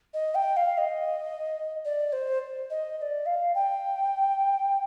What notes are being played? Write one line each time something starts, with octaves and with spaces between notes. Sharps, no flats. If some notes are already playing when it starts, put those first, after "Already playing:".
D#5
G5
F5
D#5
D5
C5
D#5
D#5
D5
F5
G5